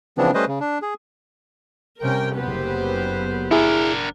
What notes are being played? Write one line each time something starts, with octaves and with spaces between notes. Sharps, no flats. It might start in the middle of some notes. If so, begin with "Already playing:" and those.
C#3 E3 F3 B3 C4 D4
G3 A3 C#4 B4 C5 D#5
C#3
D4
G#4
C3 G3 C#4 A#4 G5
F#1 F#2 B3 G4 B4 C5
D4 E4 G#4 A#4